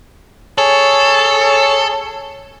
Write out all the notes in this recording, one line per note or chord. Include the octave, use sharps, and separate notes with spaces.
G#4 A4 C#5